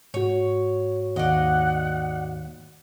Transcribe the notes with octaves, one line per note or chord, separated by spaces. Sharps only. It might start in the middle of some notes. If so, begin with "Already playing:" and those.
G#2 F#4 C#5
D#2 D5 D#5 F#5